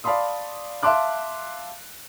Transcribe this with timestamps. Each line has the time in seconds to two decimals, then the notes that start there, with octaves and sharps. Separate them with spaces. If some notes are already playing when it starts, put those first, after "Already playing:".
0.04 D5 F5 A5 B5 C6 D#6
0.83 E5 F5 A5 C6 D6 F#6